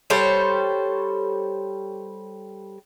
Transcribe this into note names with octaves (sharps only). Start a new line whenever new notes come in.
G3 A4 C5 C#5